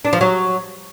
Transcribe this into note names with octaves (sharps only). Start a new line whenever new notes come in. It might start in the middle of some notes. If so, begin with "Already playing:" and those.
D4
F3
F#3